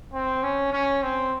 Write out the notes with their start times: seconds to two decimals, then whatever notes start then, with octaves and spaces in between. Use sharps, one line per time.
0.13 C4
0.43 C#4
0.72 C#4
1.03 C4